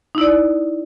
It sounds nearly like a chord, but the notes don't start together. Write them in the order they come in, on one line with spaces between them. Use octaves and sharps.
D#4 E4 D5